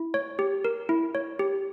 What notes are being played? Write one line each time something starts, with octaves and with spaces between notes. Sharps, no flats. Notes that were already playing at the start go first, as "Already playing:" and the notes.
Already playing: E4
C#5
G4
A#4
E4
C#5
G4